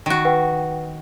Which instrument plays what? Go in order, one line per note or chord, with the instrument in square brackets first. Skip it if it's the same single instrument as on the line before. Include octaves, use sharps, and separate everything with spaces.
[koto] D#3 F#4
[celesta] B4 F#5 G5